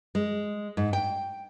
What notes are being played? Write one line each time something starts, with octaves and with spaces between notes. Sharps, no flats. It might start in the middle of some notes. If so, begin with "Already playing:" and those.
G#3
G#2
G5